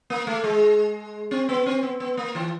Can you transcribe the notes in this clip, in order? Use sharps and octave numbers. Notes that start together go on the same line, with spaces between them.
A#3
A3
G#3
C4
B3
C4
B3
B3
A#3
E3